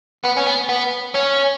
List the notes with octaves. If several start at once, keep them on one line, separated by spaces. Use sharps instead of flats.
B3
C#4
B3
B3
C#4